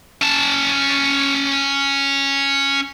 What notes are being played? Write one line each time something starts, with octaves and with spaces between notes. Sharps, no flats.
C#4 A5